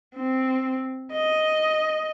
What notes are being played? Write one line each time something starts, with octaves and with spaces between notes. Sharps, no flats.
C4
D#5